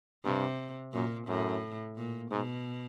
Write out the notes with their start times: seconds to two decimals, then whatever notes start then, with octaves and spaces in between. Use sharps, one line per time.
0.24 G2 C3
0.93 F#2 A#2
1.28 F#2 A2
1.97 A#2
2.31 G#2 B2